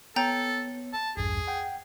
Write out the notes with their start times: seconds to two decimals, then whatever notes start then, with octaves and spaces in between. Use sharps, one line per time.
0.16 B3 A4 C#5 G5 A#5 G6
0.93 A5
1.17 A#1 E2 G2 G#4
1.48 F#5 G5